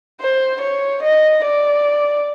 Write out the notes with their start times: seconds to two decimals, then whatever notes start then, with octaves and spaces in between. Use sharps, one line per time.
0.21 C5
0.62 C#5
1.03 D#5
1.44 D5